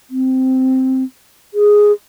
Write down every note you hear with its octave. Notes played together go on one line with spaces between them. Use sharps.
C4
G#4